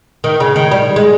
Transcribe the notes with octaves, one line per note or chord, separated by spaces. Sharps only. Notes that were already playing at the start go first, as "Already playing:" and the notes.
D#3
C#3
D#3
G3
G#3